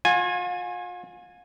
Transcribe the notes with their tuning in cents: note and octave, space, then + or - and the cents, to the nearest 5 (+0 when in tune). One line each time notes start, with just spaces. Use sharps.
F4 +40 G#5 -5